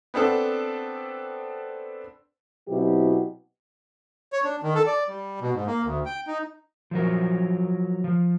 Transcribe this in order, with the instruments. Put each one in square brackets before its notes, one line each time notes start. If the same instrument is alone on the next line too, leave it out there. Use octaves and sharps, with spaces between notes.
[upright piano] B3 C4 D4 A4
[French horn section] B2 F#3 C4 E4 G4
[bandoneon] C#5
D4
D#3
A4
D5
G3
B2
G#2
A#3
D2
G5
D#4
[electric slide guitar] F3 F#3 A#4
F3